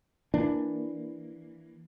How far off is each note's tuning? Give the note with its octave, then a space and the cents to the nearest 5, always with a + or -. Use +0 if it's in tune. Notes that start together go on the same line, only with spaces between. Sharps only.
E3 +0 A#3 +0 D4 +0